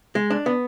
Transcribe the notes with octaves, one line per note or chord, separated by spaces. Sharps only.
G#3
D4
B3